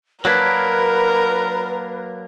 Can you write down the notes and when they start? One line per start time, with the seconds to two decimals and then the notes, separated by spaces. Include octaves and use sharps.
0.25 F#3 A#3 D4 A#4 B4 F#6 G#6 B6